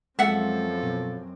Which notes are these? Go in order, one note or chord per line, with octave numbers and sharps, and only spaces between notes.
F#2 F3 G#3 C4 F4 A4 E5 F#5
B2